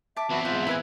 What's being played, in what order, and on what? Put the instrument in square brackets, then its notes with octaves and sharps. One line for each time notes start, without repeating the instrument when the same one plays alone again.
[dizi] E5 [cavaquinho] A5 D6
[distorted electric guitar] E2 C4 [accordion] F#4 B4 [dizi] E5
[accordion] G#2 F4 G6 [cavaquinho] F#5
[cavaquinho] E4 B4 G#5